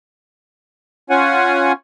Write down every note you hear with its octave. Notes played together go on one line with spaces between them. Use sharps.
C#4 F4 C#5 F#5 G#5